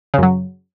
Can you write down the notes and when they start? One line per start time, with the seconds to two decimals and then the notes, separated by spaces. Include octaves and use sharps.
0.14 C#3
0.18 F#2
0.23 F#3